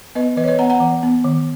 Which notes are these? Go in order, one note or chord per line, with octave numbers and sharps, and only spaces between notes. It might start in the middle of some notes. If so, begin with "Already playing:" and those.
B3 B4 D#5
E3 B4 D#5
C#5
B4 D#5
B3 F#5 A#5
F#5 A#5
E3
B3
D#3